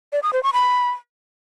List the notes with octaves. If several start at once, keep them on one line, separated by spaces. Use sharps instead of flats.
D5
D#6
C5
C#6
B5